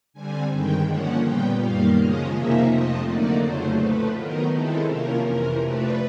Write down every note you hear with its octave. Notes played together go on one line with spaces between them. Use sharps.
D3 G3 C4 G#5
G2 D#3 G#3 G5
D3 F3 A#3 C#4 F#5
A#2 G3 B3 G5
F#2 D#3 G3 A#3 F5
C#3 F3 G#3 C#4 D#5
F2 C3 F3 A#3 D#4 E5
F2 C3 F3 A3 D#5
D3 F#3 A#3 D#4 D5
F2 C#3 F#3 A3 C5
A2 F3 A3 B4
D#3 F#3 B3 D#4 A#4
D#3 G#3 C4 E4 A4
C3 F3 A#3 C#4 A#4
F2 C3 E3 A#4
C3 F3 A3 D4 B4